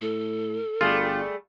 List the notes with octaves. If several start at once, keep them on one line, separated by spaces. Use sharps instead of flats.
A2 A4
G1 G3 A3 F4 G#4